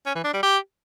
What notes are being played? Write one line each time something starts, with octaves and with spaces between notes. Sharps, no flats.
C#4
E3
D4
G3
G4